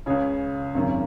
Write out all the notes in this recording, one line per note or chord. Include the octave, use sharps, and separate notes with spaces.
C#2 C#3 G#4 C#5
G#1 F#2 D#3